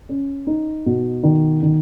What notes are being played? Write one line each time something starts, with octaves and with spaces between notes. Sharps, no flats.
C#4
D#4
B2
D#3
D#3